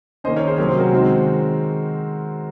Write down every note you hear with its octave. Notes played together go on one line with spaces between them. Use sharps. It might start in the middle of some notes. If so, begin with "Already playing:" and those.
D#3 A#3 C#4 C5 D#5
A#4 C#5
G#4 C5
C3 F#3 A#3 C#4 A#4
C5
F#4 A#4
D#3 G#3 C4